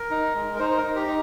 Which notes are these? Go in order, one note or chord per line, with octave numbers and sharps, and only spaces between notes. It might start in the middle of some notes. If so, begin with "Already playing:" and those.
Already playing: A#4
D#4
G#3
A#4
D#4 C5
C5
A#4
D#4
G4
D#4